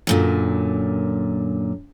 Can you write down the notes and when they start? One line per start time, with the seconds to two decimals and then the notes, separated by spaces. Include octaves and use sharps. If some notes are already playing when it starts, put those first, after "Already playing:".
0.07 F#2 A#2 D3